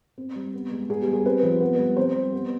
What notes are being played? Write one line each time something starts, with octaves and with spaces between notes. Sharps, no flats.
C4
G3
B3
G#3
B3 G#4
G4
G3
G#4
C4 B4
F3
B3
G3
C4 C5
G3
B3